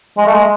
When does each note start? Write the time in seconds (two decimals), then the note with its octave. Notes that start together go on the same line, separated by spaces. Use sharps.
0.18 G#3
0.26 A3
0.34 G#3